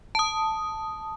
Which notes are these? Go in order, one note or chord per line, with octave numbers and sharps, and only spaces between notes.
A5 D#6